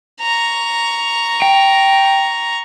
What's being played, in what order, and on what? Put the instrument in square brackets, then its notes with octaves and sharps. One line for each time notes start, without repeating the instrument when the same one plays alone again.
[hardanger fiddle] A#5 C#6
[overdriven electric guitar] G5